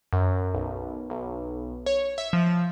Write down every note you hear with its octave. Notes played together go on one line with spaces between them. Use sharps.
F#2
B1
B1
C#5
E5
F3